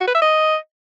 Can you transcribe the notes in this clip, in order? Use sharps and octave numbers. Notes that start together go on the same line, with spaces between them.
F#4
B4
E5
D#5